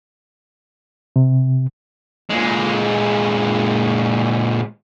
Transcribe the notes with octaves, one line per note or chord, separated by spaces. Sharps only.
C3
A#2 G#3